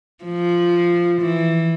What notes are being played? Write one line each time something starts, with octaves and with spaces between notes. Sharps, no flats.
F3
E3